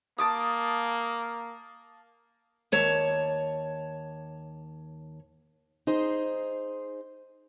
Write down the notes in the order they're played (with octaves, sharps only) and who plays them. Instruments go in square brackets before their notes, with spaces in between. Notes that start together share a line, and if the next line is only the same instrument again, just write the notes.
[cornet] A#3 [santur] A5 D6 D#6
[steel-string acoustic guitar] D#2 C#5 A5
D#4 G#4 C5